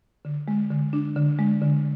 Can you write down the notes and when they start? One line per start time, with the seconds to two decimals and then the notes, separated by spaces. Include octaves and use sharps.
0.25 D3
0.48 G#3
0.71 D3
0.93 D4
1.16 D3
1.39 G#3
1.62 D3